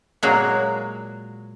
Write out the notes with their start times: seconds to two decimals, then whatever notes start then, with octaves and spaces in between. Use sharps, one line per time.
0.23 A#2 F#3 G#3 A#3